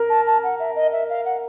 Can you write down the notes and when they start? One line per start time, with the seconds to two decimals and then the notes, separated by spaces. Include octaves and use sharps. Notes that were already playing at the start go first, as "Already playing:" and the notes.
Already playing: A#4
0.09 A5
0.26 A5
0.43 F#5
0.59 E5
0.75 D#5
0.92 E5
1.09 F5
1.25 F#5